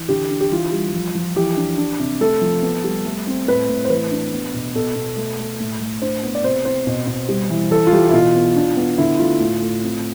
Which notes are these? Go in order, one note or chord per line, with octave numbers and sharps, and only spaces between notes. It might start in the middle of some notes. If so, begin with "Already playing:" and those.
Already playing: E3
D3 G4
D4
G4
E3 F4
G3
F3
F3
E3 G4
D4
D4
C3
A3 A4
F3
B3
G3
A3
C4
A2 B4
A2
C5
E3 B4
D4
B3
B2
B2 A4
B2
A3
A3
A2
A3
D4 C5
B3
D5
C3 C5
C4 C5
B2
B2
G3
E3
E3 A4
F4
E3 G4
E4
B2 F4
B3
D4
B3
D3 E4
A3 F4
A2
A2
C4